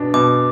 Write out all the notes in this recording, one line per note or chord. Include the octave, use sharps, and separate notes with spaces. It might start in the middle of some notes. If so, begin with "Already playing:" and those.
Already playing: B2 B3 D4
B2 D6